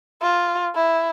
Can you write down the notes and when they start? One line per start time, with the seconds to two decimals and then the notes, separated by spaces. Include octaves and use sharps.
0.22 F4
0.76 E4